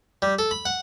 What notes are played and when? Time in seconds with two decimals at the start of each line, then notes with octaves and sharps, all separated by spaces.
0.22 G3
0.39 A4
0.51 B5
0.65 F#5